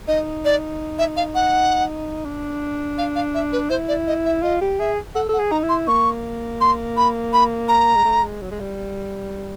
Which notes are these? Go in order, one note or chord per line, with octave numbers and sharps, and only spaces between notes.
D#4 D#5
D5
E5
F5
F#5
D4
F5
F5
E5
B4
E4 C5
D5
D#5
E5
F4 D#5
G4
G#4 E5
A4 F#5
A4 F#5
G#4
D#4 A#5
E4
C6
A#3 C#6
C6
B5
B5
A#5
G#3
A3
G#3
F#3
G#3
G3